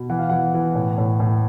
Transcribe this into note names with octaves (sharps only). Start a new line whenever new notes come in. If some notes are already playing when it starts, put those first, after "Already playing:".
Already playing: B2
E3 F#5
F5
E3 F#5
E3
A2
A2
A2